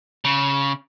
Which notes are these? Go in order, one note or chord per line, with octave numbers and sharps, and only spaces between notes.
C#3